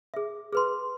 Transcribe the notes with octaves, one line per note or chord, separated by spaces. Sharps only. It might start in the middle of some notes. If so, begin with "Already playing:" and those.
G#4 E5
G#4 B4 C6